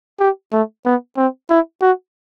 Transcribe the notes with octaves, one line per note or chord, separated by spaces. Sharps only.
G4
A3
B3
C4
E4
F#4